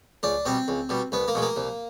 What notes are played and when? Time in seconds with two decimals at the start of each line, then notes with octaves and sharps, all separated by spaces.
0.23 C#2 D4
0.45 B2 G3 C4
0.68 C#2
0.89 B2 G3
1.12 C2 B3
1.28 A#3
1.35 B2 G#3
1.42 A#3
1.56 C2